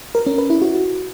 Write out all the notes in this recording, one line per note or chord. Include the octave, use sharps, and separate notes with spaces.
A#4
C#4
B4
E4
F#4